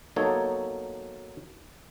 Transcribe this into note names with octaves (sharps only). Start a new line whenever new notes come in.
F#3 A#3 B3 D#4 A4 C#5